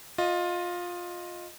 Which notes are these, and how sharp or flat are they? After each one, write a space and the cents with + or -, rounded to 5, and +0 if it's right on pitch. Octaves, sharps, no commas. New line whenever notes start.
F4 +15 D#5 +0